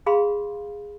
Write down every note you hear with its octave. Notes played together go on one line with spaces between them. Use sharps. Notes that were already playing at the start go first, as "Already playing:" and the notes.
G#4 F5 B5 C6